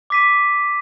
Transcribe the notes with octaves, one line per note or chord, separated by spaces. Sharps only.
D6 B6 D#7